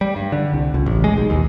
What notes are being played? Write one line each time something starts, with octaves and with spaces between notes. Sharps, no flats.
G3
G2
D3
C2
C#2
A1
G#3
B1
D#2